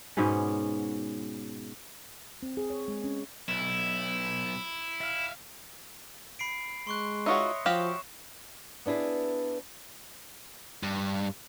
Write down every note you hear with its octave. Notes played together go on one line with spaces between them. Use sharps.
G#2 B2 B3 C#4
C4
G#4
C#5
G#3
C#4
B1 E4
E5 F5
B5 C7 D7
G#3 C6 C#6 F#6
D#4 F4 F#4 C#5 D#5 E5
F3 F#4 G4 F5 E7
B3 D4 E4 G#4 B4
G2